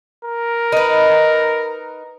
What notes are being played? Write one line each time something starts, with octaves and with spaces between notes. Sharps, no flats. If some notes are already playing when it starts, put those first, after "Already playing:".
A#4
D#4 B4